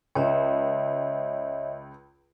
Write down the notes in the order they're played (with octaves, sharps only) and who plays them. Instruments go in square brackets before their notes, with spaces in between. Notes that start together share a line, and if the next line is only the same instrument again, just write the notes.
[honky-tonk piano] C#2 [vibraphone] C#5 D#5 E5